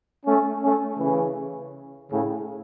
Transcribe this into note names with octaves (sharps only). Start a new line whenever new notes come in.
A3 C#4
A3 C#4
C#3 E3
A2 C#3